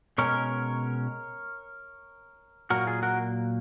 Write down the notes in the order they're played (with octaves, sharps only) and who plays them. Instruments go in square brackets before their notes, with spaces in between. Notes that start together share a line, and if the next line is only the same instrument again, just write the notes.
[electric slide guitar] B2 G#3 C#4 A#4 C#5
A#2 F#3 A#3 F#4 A#4
F4 G#4
F#4 A#4